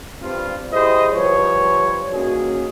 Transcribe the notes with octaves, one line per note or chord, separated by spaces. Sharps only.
G2 C4 F4
E4 G4 G#4 C5 D#5
F3 G3 B4 C#5
D#3 A#3 C#4 F#4 G#4